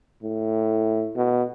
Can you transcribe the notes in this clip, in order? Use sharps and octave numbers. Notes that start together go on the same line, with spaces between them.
A2
B2